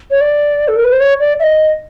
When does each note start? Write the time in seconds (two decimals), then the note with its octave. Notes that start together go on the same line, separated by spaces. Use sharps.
0.11 C#5
0.21 D5
0.68 A4
0.76 A#4
0.84 B4
0.92 C5
1.00 C#5
1.20 D5
1.40 E5
1.43 D#5